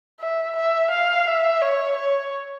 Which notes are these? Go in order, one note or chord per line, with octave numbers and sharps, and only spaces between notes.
E5
E5
F5
E5
C#5
C#5